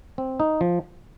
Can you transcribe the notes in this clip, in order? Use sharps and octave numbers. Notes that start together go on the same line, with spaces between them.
C4
D#4
F3